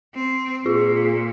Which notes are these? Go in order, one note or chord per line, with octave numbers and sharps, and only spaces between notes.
C4
A#2 F4 G#4